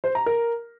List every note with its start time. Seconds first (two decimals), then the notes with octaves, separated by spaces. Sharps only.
0.04 C5
0.15 A#5
0.26 A#4